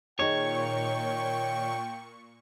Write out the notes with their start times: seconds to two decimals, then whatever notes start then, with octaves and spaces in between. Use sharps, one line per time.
0.19 A#2 D#3 D#4 G#4 C#5 G5 C#6